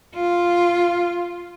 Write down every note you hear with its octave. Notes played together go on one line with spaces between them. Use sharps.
F4